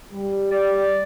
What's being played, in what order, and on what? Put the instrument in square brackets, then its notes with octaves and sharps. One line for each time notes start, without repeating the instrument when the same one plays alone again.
[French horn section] G3
[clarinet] D5